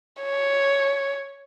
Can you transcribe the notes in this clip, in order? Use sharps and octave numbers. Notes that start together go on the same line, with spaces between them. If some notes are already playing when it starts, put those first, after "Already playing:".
C#5